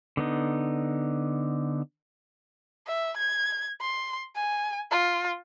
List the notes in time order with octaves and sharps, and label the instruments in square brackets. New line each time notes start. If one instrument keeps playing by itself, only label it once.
[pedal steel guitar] D3 B3 D#4
[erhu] E5
G#6
C6
G#5
F4